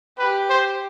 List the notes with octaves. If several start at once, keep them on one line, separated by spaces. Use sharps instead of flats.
G4 B4
C5